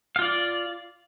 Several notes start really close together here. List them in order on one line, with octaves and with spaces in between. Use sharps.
F5 F4 D5